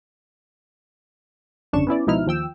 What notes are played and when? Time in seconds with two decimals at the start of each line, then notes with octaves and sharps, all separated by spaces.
1.73 G1 F2 C#3 D4 C#6 E7
1.87 B3 C#4 E4 D5
2.07 C#2 B2 F3 D#4 E4 F6
2.26 D#2 F3 G5 E6